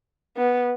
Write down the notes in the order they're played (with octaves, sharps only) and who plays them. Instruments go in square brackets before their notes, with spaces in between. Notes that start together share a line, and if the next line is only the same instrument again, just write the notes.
[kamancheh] B3